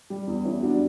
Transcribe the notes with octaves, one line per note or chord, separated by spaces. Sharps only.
G3
E2
E2 C#4 E4
G3 D4 F#4